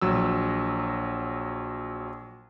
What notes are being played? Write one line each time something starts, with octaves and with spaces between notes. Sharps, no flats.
A#1 F#3 E6